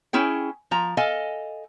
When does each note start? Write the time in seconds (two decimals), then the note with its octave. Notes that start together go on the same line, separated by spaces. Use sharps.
0.13 C#4 E4 G#4 G5
0.71 F3 A#5
0.97 A4 D#5 F5 G#5